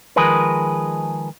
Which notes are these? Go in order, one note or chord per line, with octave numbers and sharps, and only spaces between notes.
D#3 F3 G#3 G#4 A#4 B4